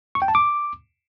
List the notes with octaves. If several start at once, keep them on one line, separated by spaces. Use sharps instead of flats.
C#6
G5
A5
D6